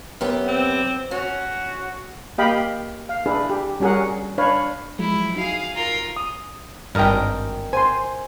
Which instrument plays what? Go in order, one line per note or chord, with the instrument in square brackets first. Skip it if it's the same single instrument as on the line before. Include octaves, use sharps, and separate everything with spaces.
[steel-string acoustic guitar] F#2 B3 G4
[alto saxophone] C4
[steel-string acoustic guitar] C#4 [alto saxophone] F#4
[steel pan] A#3 G4 D#5 F5 G5 B5
F5
D4 E4 G#4 A4 B4
G4
G3 C#4 F#4 G#4 A#4 F#5
D4 B4 C#5 F5
[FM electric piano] F3 F#3 G#3 [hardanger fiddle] E4
[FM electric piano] D#4 F#4 [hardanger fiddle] G#4 F5
[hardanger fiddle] F4 A#4
[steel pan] D#6
[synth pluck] G#1 G2 [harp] A#4 D#5 G5
[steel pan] C5 C6 [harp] G#5